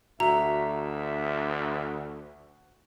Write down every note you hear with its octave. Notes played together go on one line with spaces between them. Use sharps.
D2 F#4 E5 A#5